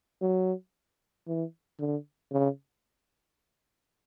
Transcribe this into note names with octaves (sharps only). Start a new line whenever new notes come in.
F#3
E3
D3
C#3